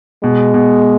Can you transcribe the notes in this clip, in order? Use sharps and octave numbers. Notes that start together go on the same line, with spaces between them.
B2 G#3
B2